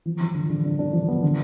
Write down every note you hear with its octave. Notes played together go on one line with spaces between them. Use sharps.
F3
F3
D3
D3
D4
D4
F3
B3
D3